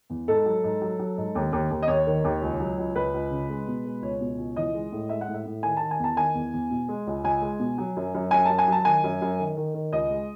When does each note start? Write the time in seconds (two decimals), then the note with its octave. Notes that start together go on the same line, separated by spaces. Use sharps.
0.10 E2
0.28 G#2 A4
0.46 F#3
0.64 G#2
0.82 F#3
0.99 F#3
1.17 G#2
1.35 D#2
1.52 D#2
1.71 D#2
1.82 D#5
1.88 D#2 C#5
2.07 D#3
2.24 D#2
2.42 C#2
2.60 F#3
2.78 C#2
2.95 C#2 B4
3.14 C#2
3.31 C#3
3.50 G#3
3.68 B2
3.85 G#3
4.02 C#2 C#5
4.21 B2
4.38 C#2
4.56 E3 D#5
4.74 G#3
4.92 A2
5.09 G#3 E5
5.21 F#5
5.28 A2
5.34 E5
5.46 A2
5.63 D#3 G#5
5.77 D#3 A5
5.91 G#5
5.99 E2 A5
6.17 D#3 G#5
6.35 E2
6.53 E2
6.71 B2
6.88 G#3
7.07 C#2
7.24 C#2 G#5
7.42 G#3
7.59 B2
7.78 F#3
7.96 F#2
8.14 F#2
8.31 F#2 G#5
8.45 F#2 A5
8.58 G#5
8.68 F#3 A5
8.85 D#3 G#5
9.04 F#2
9.22 F#2
9.39 D#3
9.57 D#3
9.74 D#3
9.93 C#2 D#5
10.10 G#3